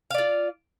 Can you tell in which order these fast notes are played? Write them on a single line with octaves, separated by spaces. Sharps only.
F5 D5 F4